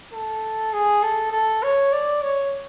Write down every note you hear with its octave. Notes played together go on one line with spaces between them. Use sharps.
A4
G#4
A4
A4
C#5
D5
C#5